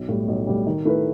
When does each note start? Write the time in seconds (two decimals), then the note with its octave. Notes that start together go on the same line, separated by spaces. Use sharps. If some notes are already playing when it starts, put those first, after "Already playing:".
Already playing: B1
0.09 A2 G3
0.28 B1
0.47 A2 G3
0.67 D#3
0.85 A3 E4 B4